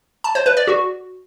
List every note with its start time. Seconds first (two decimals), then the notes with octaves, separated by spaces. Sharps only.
0.24 A5
0.35 C5
0.46 B4
0.57 D5
0.67 F#4